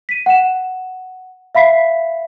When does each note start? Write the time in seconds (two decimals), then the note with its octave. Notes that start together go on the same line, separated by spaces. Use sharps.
0.09 B6 D#7
0.26 F#5 E7
1.55 E5 F5 B5 B6 C7